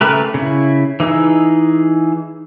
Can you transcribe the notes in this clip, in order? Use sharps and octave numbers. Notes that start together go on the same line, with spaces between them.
C#3 A3 G4 A#4 B4
C#3 E4
E3 D#4 G#4 E6